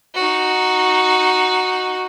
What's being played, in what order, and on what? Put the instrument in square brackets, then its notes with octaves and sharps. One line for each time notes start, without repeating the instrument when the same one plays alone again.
[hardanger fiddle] D#4 F#4